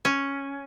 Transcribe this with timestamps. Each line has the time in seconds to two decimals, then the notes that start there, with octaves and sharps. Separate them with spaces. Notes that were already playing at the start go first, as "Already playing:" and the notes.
0.05 C#4